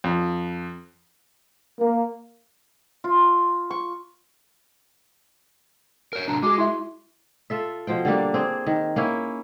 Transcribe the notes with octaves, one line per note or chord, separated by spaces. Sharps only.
F2
A#3
F4
C#6
A#4 C#5
C3 F#3 D4 A#5
G#3 F#4 G#4 D6
E4 E5 C6
F4 A4 E5
B2 F3 C5 G5
D3 G3 A#3 D4
C4 G#4
D#3
A#3 C#4 E4